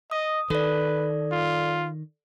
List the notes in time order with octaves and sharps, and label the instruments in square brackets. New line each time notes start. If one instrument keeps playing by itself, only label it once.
[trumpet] D#5 [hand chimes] D#6
[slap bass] D#3 [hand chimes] A4 D5 [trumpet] B4
[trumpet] F4